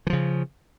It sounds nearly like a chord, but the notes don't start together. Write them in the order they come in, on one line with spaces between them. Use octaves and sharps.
E3 F3 C#3